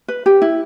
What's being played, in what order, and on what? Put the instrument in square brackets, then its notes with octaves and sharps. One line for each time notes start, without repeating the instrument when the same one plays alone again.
[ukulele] B4
G4
E4